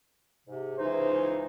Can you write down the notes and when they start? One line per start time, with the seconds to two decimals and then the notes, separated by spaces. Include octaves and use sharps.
0.47 G#2 C3
0.78 C#2 E3 D#4 G#4 C5